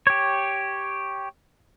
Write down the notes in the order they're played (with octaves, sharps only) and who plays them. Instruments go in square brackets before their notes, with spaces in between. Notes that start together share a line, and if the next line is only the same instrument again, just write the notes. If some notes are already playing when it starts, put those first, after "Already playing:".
[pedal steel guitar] G4 C#5